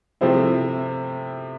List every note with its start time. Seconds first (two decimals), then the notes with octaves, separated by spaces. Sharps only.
0.21 C3 F3 A3 C4 E4